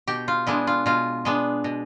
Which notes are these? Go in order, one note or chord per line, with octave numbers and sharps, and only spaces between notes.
B2 G4
F4
G#3 B3 D4 E4
F4
B2 F4
G#3 B3 D4
B2